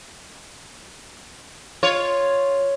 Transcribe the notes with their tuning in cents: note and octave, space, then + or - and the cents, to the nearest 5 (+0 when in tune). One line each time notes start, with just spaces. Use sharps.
F4 +0 C#5 +0